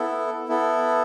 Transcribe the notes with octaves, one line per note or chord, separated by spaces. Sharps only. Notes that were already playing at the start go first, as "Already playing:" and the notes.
Already playing: B3 E4 A4
B3 E4 A4